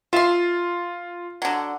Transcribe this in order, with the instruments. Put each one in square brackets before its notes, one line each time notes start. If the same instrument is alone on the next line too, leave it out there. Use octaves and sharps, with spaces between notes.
[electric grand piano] F4 [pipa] E5 C6
[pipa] D3 F#3